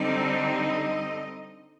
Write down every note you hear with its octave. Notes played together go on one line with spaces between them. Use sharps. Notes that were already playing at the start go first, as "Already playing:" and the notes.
Already playing: D3 G3 C4 D#4 D5
D#5